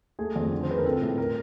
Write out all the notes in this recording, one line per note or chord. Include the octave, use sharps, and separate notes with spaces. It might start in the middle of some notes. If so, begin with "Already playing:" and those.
A3 G#4
F2
D3
C5
D3 B4
A#4
C4 A4
A2
A#4